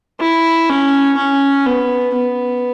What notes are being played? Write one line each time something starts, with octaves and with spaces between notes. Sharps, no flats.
E4
C#4
C#4
B3
B3